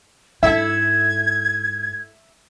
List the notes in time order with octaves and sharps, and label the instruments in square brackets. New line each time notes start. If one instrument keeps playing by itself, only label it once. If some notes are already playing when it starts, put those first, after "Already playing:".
[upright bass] G#2 [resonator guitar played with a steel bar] E4 A4 [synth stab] E5 [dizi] G#6